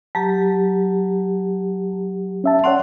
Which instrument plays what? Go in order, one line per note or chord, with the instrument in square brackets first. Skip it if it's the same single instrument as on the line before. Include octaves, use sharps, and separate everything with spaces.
[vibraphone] F#3 G4 [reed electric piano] A5 A#5
[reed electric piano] C#4 E5 A5
[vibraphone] C#4 D5 G5 [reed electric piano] C#5 F#5 C6